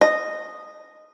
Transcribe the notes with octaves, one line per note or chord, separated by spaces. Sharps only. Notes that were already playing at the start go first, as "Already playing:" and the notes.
D#5